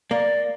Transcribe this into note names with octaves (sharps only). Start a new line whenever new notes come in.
A#3 D5